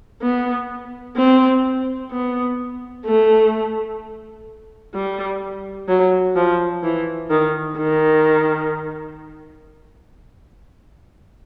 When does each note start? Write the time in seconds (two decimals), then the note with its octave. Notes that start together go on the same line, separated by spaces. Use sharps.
0.21 B3
1.16 C4
2.11 B3
3.05 A3
4.94 G3
5.88 F#3
6.36 F3
6.83 E3
7.30 D#3
7.77 D#3